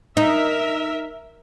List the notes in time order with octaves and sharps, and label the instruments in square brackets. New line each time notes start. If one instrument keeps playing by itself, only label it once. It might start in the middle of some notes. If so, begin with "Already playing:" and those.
[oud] D#4 [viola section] A#4 E5